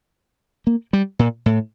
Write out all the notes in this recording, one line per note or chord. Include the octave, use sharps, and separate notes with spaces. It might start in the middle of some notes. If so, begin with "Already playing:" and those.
A#3
G3
A#2
A2